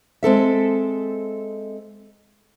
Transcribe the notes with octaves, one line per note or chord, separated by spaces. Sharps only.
G#3 C4 A4 E5